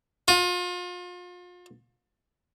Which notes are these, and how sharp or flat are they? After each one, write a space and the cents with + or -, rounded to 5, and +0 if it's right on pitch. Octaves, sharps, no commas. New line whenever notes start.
F4 +35